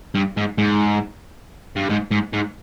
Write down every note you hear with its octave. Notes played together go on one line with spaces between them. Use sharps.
G2
G#2
G#2
G2
G#2
G#2
G#2